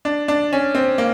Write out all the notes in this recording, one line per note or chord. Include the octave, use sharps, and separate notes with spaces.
D4
D4
C#4
C4
A#3